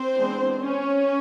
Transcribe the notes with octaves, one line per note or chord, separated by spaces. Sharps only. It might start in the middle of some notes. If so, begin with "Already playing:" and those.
Already playing: C4 C5
E3 G#3 B3 D4
C#4 C#5